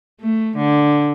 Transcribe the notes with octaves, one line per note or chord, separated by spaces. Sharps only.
A3
D3